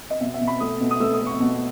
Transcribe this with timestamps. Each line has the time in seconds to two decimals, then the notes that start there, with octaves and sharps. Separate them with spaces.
0.10 D#5
0.20 B2 E5
0.34 E5
0.41 B2
0.47 B5
0.60 A3 D#6
0.81 B2
0.91 D#6
1.00 A3 E6
1.14 D#6
1.20 A3
1.27 C#6
1.40 B2